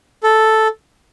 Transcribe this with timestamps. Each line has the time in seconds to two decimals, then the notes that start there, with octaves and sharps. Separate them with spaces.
0.23 A4